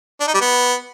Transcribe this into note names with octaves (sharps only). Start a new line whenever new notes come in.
D4
D#4
G3
B3